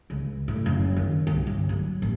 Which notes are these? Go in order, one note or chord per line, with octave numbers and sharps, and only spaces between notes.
C#2
A2
F#1
D#3
C2
G1
F#3
A1